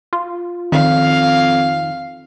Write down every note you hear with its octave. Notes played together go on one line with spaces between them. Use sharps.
F4
F2 D#3 F5